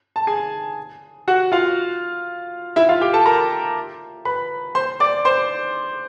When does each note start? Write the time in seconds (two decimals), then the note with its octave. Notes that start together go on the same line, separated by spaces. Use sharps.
0.16 A5
0.27 G#4 G#5
1.28 F#4 F#5
1.52 F4 F5
2.76 E4 E5
2.89 F4 F5
3.01 G4 G5
3.13 A4 A5
3.26 A#4 A#5
4.25 B4 B5
4.75 C5 C6
5.00 D5 D6
5.25 C5 C6